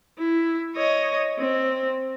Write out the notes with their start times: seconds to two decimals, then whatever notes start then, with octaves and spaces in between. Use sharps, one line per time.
0.18 E4
0.75 C#5 D#5
1.38 C4